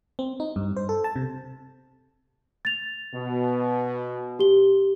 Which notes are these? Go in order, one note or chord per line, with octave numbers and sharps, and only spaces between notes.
C4
D#4
G2
C5
A4
A5
C3
A6 F7
B2
G4 G7